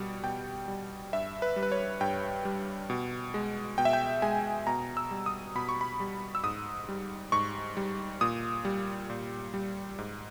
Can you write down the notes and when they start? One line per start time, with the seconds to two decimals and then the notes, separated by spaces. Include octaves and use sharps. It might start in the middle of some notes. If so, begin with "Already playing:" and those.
Already playing: B2 G3
0.23 B2 G5
0.68 G3
1.13 G2 E5
1.42 B4
1.56 G3
1.63 B4
1.72 C#5
2.01 G2 G5
2.45 G3
2.90 B2
3.34 G#3
3.78 B2 G5
3.85 E5
3.93 G5
4.22 G#3 G#5
4.67 B2 A#5
4.97 E6
5.11 G3
5.26 D#6
5.55 B2 B5
5.69 C#6
5.81 B5
6.00 G3
6.35 E6
6.43 G#2 D#6
6.89 G3
7.32 G#2 C#6
7.77 G3
8.21 A#2 D#6
8.65 G3
9.10 A#2
9.54 G3
9.98 G#2